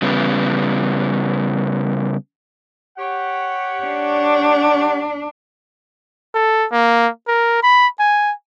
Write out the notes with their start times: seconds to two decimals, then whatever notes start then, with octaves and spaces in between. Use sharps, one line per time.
0.02 C#3 G3 B3
2.98 G4 C#5 F#5
3.83 D4
6.34 A4
6.72 A#3
7.28 A#4
7.63 B5
7.99 G#5